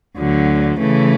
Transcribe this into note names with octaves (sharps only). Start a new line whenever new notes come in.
D2 D3 F#3
C#3 E3 A3